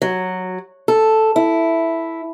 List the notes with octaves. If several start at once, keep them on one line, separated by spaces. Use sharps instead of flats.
F#3
A4
E4